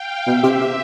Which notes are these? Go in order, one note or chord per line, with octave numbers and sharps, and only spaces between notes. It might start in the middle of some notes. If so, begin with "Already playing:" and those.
Already playing: F5 G5
B2 E5
C3
C3